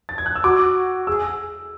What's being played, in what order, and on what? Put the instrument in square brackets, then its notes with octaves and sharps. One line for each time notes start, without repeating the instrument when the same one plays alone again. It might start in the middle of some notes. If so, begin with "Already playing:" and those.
[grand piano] A6
G#6
F#6
E6
[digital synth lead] F#4 [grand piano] D6
[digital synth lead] G#4 [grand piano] E6